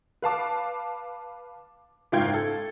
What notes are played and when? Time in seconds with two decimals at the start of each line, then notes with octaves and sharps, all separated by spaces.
0.22 B4 F5 A5 D6
2.12 F#1 G#2 F4 F5 G5 G#6
2.34 A4